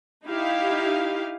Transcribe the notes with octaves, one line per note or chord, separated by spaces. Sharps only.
D#4 E4 G4 F5